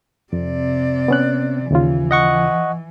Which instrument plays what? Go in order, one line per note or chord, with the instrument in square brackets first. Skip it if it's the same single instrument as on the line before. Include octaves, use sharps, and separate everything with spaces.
[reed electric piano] F2 [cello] C3 D5
[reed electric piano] B3 C#4 F#6
[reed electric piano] D#2 C#3 F4 [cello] E3
[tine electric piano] D#5 F#5 C#6